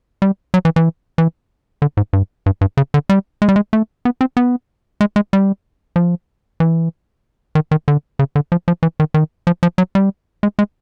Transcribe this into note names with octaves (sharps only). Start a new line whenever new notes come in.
G3
F#3
E3
E3
E3
D3
G#2
G2
G2
G2
C#3
D3
G3
G#3
G3
G#3
A3
B3
C4
B3
G#3
G#3
G3
F3
E3
D#3
D#3
D3
C#3
D3
F3
F3
E3
D#3
D#3
F3
F3
F#3
G3
G#3
G#3